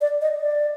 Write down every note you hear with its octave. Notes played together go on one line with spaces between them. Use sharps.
D5
D#5
D5